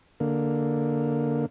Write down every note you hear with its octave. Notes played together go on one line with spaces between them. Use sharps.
D3 A#3